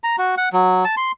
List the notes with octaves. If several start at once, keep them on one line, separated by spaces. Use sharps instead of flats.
A#5
F#4
F#5
F#3
A5
C6